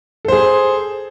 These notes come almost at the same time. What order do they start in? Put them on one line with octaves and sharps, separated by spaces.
A4 C5 G#4